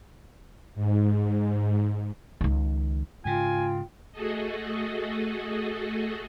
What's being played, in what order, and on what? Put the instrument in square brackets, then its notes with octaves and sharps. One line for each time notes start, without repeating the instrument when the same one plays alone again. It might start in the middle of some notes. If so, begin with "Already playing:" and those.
[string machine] G#2
[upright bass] C#2 D#3
[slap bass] G#2 C#3 [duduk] F4 [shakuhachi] G5 [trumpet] G#5
[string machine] A3 F#4 G#4 A4 D#5